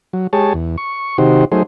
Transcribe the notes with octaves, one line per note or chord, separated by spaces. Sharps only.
F#3
G#3 G4 G#4 C#5 A5
E2
C#6
C3 D#3 D#4 F#4 G4 C5
F#3 A3 D#4 G#4 C5